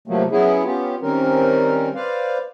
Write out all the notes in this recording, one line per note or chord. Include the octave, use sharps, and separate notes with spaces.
C3 F3 F#3 A3 A#3
F#3 B3 C#4 E4 G#4
B3 C#4 F4 G4
D#3 G3 C4 C#4 A#4
B4 C5 D5 F5